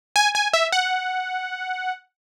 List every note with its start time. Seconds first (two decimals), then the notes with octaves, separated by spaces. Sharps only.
0.16 G#5
0.35 G#5
0.53 E5
0.72 F#5